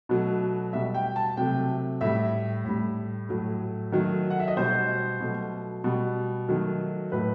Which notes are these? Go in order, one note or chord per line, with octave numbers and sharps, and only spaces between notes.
B2 F#3 A3
B2 G3 E5
G5
A5
C3 F#3 A3 G5
A2 G3 E5
A2 G3
A2 F#3 A3
D#3 F#3 A3
F#5
E5
D#5
B2 G3 C5
B2 F#3 A3
B2 G3
D#3 F#3 A3
A2 F#3 A3 B4